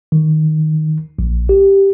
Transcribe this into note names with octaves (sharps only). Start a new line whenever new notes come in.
D#3
A#1
G4